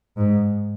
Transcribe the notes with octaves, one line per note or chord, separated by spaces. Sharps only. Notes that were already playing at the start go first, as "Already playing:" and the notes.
G#2